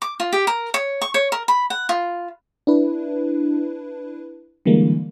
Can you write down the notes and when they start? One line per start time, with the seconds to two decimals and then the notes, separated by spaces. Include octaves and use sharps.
0.02 D6
0.20 F4
0.33 G4
0.47 A#4
0.74 C#5
1.02 C#6
1.14 C#5
1.32 A#4
1.48 B5
1.70 F#5
1.89 F4
2.67 D4 E4 B4
4.66 D3 E3 G3 G#3 A#3